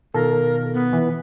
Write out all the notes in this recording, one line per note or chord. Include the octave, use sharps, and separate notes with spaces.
B2 D#3 F4 A4 A#4
B3
E3